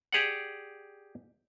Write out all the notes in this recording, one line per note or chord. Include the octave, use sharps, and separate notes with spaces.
G4 G#4 D5 F#5